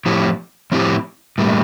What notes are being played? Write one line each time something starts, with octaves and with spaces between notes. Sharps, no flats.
A2 F3 C4 E4 G4
A2 F3 C4 E4 G4
A2 G3 A#3